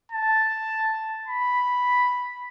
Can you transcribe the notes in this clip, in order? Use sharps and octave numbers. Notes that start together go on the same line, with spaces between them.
A5
B5